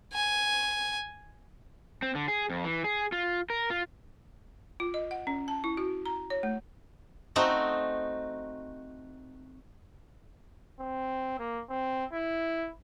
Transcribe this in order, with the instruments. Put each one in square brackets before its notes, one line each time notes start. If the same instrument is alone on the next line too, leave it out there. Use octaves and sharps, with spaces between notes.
[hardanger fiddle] G#5
[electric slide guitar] C4
D3
G#4
F2
E3
G#4
F4
A#4
F4
[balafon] F4
D#5
F#5
C#4
A5
E4
F#4
A#5
C#5
A3
[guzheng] A3 C4 D#4 F#4
[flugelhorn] C4
A#3
C4
E4